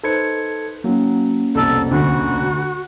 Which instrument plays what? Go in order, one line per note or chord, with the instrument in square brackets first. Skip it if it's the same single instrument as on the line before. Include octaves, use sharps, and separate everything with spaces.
[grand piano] D#4 B4 C5 [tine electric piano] A4 G#6 C#7
[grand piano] F#3 [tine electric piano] A#3 C#4
[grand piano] C2 F2 B2 [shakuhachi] A4
[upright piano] D2 [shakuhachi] F#4